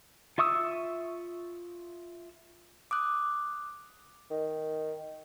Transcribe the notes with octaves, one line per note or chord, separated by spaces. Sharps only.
F4 E5 C#6 D#6 E6
D6 D#6 F#6
D#3